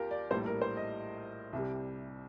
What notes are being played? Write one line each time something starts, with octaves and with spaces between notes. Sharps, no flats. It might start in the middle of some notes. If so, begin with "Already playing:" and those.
Already playing: D#2 F4 G4 A#4
D5
A#1 A2 G3 C5
A#4
C5
D#5
C2 C3 G3